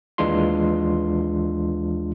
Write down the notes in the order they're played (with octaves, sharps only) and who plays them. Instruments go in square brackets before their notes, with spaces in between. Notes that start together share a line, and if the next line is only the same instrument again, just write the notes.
[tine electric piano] D#2 E3 G#3 D4 F4 C6